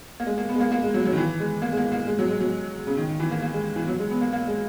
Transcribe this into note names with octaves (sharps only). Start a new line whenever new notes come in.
A#3
G#3
A#3
B3
G#3
A#3
A#3
G#3
F#3
F#3
D#3
E3
G#3
A#3
G#3
A#3
A#3
G#3
F#3
G#3
F#3
C#3
D#3
D#3
E3
A#3
A#3
G#3
E3
F#3
G#3
B3
A#3
A#3
G#3